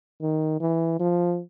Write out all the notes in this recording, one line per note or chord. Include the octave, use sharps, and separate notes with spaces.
D#3
E3
F3